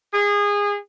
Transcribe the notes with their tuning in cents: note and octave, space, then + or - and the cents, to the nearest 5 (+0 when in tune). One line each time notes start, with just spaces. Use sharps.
G#4 -25